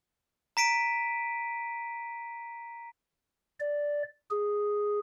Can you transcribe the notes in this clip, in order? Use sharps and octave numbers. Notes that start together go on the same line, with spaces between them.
A#5 B6 D7 D#7
D5
G#4